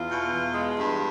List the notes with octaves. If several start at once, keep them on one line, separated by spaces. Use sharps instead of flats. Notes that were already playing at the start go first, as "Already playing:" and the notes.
Already playing: E2 F4
B2
E2
G#3
G2